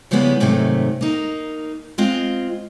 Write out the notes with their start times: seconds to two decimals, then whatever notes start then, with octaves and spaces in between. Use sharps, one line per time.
0.11 C#3 F3 G3 G#3 B3 E4
0.40 G#2 C3 D#3 F#3 A3
1.01 A#3 D#4
1.98 G#3 C4 F4 D#5